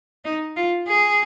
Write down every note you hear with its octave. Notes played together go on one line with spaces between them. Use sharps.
D#4
F4
G#4